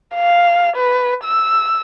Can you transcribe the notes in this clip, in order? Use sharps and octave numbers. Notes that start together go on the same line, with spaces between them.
F5
B4
E6